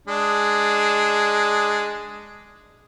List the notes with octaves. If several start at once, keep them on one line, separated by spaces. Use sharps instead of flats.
G#3 D4